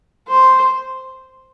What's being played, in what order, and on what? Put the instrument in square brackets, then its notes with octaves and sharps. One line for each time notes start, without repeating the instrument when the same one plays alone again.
[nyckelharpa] C5